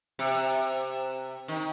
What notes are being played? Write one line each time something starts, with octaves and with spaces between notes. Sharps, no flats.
C3
D#3